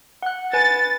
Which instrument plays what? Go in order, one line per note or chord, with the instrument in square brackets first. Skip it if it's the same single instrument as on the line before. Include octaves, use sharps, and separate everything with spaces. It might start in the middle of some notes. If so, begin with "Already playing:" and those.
[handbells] F#5 F#6
[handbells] B4 G#5 [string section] A6